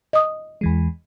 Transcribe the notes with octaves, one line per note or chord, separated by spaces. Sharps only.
D#5 D#6
E2 E3 G#3